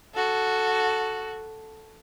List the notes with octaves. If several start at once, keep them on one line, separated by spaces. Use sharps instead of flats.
F#4 A4